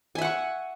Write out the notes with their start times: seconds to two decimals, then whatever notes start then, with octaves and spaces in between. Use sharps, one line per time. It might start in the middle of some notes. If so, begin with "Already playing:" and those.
0.15 G#5
0.18 E5
0.21 F#5
0.25 C#6